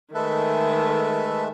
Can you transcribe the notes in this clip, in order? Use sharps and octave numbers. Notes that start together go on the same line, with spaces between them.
D#3 G#3 A3 A4 B4 E5